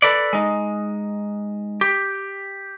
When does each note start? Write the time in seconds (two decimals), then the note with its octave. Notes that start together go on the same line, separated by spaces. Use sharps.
0.02 A4 B4 D5
0.33 G#3 D#4
1.81 G4